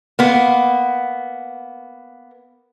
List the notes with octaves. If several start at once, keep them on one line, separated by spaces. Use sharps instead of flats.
A#3 B3